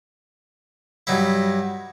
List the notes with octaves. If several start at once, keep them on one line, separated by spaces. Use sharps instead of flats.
G2 F#3 D#4 E4